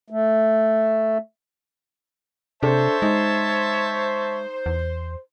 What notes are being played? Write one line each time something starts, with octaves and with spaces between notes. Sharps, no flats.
A3
C3 D4 A4 C5 C#5 E5 A5
G#3 D#4
E2